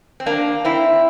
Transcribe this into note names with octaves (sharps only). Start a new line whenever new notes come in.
C4
A#3 D4
C4 E4